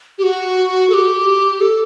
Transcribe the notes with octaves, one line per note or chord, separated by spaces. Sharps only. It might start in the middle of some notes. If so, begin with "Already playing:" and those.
G4
F#4
A4
G4
A4